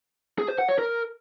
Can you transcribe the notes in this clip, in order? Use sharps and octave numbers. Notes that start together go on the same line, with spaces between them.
G#4
C5
F#5
C#5
A#4